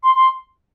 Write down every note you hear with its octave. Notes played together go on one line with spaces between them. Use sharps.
C6
C6